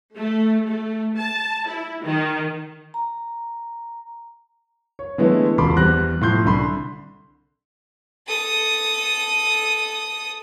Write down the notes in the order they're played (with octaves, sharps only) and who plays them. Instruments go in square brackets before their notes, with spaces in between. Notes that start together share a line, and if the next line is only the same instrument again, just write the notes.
[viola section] A3
A3
A5
E4
D#3
[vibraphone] A#5
[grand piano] C#5
D3 E3 G#3 A3 B3 E4
E1 C#2 A4 B5 C6 D6
E2 G3 C4 F#6 A#6
A2 F3 C6 G6
C2 D3 B5 C6
[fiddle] A4 D#6